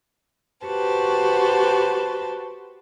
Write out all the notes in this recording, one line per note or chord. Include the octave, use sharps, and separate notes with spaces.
F#4 G4 B4 C5 A5